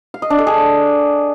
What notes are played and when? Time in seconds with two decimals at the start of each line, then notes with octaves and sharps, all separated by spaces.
0.14 F5
0.22 D#5
0.30 D4
0.39 A4
0.47 G#4